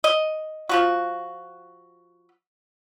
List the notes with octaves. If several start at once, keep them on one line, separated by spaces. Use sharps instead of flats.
D#5
F3 F4 F#4